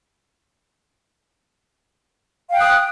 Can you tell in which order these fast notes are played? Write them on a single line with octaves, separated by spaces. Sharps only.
F5 G5 F#6 D#6